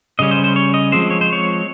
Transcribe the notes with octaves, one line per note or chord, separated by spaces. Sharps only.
C#3 G3 C#4 D#5
C5
C5
C#5
D#5
F3 G#3 C4 C5
C#5
C5
C#5